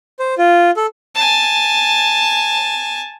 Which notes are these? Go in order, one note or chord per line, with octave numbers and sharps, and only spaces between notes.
C5
F4
A4
G#5 A5